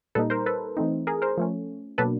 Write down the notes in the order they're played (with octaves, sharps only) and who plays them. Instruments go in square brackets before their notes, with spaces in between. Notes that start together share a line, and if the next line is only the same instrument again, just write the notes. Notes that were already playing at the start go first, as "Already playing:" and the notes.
[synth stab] A#2 G3 A#3 D#4 A4 B4
A#4 C5
A4 B4
E3 A3 C4 D#4
G#4 A#4
A#4 C5
F3 A3 C#4
B2 F#3 A#3 D4 A4 B4